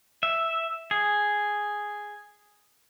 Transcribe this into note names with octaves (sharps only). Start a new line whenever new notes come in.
E5
G#4